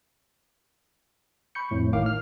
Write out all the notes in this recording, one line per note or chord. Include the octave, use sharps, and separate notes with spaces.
B5 C#6 G6 C#7
F2 A2
G#1 A2 D#3 F5 D6 C7
F6